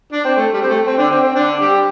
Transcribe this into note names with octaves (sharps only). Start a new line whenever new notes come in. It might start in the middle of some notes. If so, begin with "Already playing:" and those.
D4
C4
A3
G3
C4
A3
C4
D3 D4
C4
C4
D3 D4
G3 G4